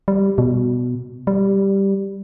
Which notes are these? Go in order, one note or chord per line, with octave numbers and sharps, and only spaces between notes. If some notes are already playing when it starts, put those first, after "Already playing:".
G3
B2
G3